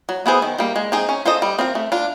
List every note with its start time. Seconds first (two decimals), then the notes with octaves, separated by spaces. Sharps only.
0.09 F#3
0.26 B3 E4 G#4 C5
0.42 D#3
0.59 G3 A#3
0.76 G#3
0.92 C4 D#4 G#4
1.09 C#4
1.26 F4 A4 C5 D#5
1.42 G3
1.59 C4 F4 A#4
1.75 A3
1.92 D4 F4